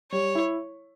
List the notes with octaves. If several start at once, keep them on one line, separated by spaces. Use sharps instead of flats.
G3 C#5
E4